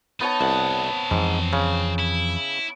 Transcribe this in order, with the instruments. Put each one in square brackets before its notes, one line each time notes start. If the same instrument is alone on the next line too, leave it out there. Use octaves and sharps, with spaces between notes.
[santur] B3 C#5 A5 [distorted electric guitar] D#4
[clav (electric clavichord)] C2 [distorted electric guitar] C4 F#5
[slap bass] F2 E3 [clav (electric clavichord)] G#2
[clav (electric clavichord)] C#3
[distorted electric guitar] E4